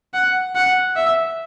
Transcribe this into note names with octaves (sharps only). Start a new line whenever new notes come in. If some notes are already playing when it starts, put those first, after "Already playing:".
F#5
F#5
E5